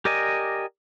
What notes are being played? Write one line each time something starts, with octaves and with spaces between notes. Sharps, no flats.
G4 A#4 D5 D#5 G#5